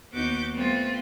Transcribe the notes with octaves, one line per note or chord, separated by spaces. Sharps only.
D#2 B3 D#4 F#4 D6 G6
G3 A3 B3 C4 F4